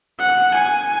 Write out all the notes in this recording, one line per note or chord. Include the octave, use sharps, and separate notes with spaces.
F#5
G#5